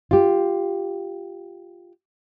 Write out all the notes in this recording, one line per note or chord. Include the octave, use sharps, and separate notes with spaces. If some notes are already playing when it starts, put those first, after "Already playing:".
F4 G4